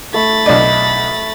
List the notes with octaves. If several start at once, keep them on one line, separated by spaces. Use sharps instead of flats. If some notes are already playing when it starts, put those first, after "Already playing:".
A3 B5 A6
B1 D4 D5 D#5